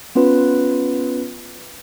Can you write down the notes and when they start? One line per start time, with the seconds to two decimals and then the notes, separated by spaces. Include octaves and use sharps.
0.15 B3 C#4 F4 B4